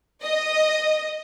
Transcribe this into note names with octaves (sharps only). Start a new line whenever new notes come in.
D#5